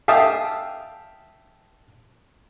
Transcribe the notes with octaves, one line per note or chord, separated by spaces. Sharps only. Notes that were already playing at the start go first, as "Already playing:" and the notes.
E5 F5 G5 A5 D#6 E6